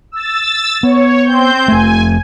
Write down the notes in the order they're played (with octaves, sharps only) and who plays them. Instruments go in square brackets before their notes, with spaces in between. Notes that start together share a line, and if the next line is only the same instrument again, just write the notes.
[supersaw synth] E6 A6
[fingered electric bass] B3 [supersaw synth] C#5
[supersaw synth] C4 C5 G6
[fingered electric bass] F1 A3 [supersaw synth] G#5